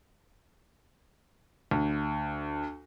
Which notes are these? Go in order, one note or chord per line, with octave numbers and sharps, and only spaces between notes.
D2